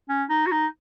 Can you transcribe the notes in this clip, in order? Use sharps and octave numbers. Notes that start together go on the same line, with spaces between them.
C#4
D#4
F#4
D#4